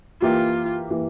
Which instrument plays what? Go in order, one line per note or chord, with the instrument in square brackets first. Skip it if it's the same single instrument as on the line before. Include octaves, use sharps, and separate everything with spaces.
[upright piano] E3 A#3 E4 G4 [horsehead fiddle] F4
[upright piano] E3 A#3 E4 G4